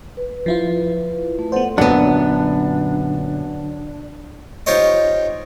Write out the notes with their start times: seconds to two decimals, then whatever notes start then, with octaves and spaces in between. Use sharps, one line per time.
0.17 B4
0.46 F3 E4 F4
1.39 A3
1.52 B3 A4 C5 D5 F#5
1.78 F#2 A#2 D3 F#3 B3 D4
4.66 D#4 F4 G4 C5 C#5 D#5